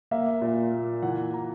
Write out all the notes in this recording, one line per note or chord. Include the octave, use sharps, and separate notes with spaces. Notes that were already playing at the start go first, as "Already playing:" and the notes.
A#3 E5
A#2
A#3
E3 F#5
A#5